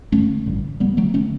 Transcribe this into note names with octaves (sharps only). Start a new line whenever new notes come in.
A1 G2 D3 A3 C#4
A1 G2 D3
D2 D3 G3 B3
F#3 A3
D3 A3 C#4